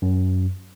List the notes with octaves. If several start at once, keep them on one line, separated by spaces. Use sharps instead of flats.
F#2